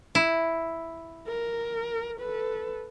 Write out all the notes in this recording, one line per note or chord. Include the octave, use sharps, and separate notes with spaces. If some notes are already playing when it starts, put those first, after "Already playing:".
E4
A#4
A4 B4